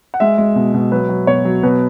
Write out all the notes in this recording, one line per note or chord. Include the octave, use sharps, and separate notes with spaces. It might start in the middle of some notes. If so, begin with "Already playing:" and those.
F#5
G#3 E5
G#3
B2
B2
F#3 B4
F#3
B2 C#5
F#3
B2 B4